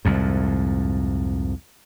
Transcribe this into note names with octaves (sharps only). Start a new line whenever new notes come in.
C2 F2 G#2